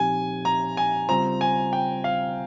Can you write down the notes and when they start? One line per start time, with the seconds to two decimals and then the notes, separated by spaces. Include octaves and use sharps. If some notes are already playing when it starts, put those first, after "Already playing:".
Already playing: A#2 F3 C4 D#4 G4 G#5
0.45 A#5
0.77 G#5
1.09 C#3 G3 C4 F4 C5 A#5
1.41 G#5
1.73 G5
2.04 F5